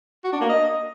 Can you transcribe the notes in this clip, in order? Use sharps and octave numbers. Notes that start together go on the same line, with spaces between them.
F#4
D4
A#3
D#5